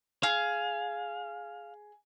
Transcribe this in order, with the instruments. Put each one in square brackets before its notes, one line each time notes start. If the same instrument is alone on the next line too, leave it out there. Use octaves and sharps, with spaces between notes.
[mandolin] G#4 [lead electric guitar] F5